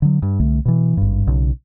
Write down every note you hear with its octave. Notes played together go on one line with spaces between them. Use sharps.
D3 F#3
G2
C2 D3 A3
B2 E3
G#1 G2
B1 C#3